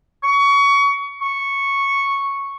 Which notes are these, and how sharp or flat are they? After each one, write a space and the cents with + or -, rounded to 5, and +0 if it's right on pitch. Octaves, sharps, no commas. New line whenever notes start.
C#6 +25
C#6 -5